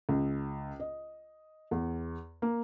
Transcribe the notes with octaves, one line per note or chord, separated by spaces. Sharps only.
C#2
D#5
E2
A#3